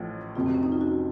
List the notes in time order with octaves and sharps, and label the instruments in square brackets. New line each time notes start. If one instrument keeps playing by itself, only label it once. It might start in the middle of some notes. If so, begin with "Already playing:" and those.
Already playing: [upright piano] A1 A2 F3
[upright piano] F1 F2 C3 F#3 [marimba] F4
[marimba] C4
C#4
D#4
F4
F#4